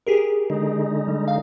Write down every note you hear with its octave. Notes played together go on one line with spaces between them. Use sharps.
G4 G#4 A#4
D3 G#3 D#4
G3
F5